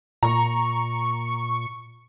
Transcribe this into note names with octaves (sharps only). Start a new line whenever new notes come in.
A#2 A#5 C#6